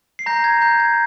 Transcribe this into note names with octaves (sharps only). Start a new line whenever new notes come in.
C7
A#5 G6 A#6
G#6
A#5 G6
G#6